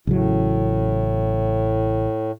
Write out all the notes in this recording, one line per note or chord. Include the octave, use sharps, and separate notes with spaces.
A1 A2 C#3 F#3